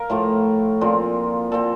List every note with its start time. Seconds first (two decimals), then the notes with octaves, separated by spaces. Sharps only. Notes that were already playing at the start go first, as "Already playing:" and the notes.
Already playing: A#4 F5
0.10 A2 F3 A3
0.81 A#2 F3 C4
1.52 A#2 F3 C4 A4